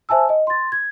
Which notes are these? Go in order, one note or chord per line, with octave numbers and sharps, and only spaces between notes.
C5 E5 G#5 A5 E6
D#5
C6 A6
G#6